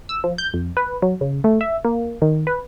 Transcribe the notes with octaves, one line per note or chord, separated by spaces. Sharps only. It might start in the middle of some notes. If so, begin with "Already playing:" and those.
E6
F3
G6
F2
B4
F#3
C#3
A3
E5
A#3
D#3
B4